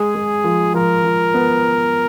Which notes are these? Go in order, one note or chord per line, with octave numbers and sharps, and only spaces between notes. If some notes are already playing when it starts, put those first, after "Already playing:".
Already playing: G#3 G#4
G#3
F3
F3 A#4
F3
B3